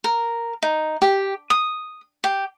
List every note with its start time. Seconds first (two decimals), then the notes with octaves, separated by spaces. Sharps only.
0.04 A#4
0.62 D#4
1.02 G4
1.50 D#6
2.24 G4